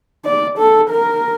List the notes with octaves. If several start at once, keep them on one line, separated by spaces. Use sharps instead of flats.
D5
A4
A#4